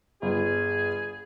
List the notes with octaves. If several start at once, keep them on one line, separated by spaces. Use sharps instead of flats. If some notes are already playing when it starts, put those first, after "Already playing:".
G1 G#4